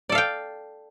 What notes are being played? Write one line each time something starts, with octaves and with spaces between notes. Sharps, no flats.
A4 D5 F5 G5